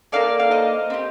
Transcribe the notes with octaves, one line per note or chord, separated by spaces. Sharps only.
A#3 D#4 A4 D5 F5
F5
C5 D#5
C4 G4